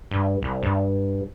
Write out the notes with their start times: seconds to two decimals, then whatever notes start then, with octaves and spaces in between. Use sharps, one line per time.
0.11 G2
0.42 C2
0.63 G2